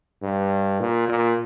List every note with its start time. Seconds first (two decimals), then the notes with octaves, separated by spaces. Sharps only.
0.23 G2
0.80 A#2
1.09 A#2